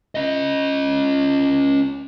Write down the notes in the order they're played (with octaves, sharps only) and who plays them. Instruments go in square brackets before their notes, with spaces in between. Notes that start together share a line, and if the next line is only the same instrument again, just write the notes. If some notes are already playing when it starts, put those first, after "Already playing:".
[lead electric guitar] C#4 D#5